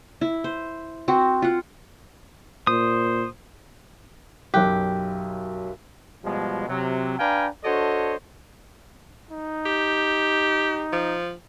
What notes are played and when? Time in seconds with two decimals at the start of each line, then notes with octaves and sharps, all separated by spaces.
0.21 E4
0.44 C5
1.08 C4 F#4
1.42 F4 F#5
2.67 A#2 C5 D#6
4.54 B1 F#2 G4 F#6
6.25 B2 F3 G3 G#3
6.68 C3 F#3
7.19 D4 B4 F5 G5 G#5 A#5
7.64 D4 F#4 A4 C5 C#5 D#5
9.31 D#4
9.66 G4
10.92 F3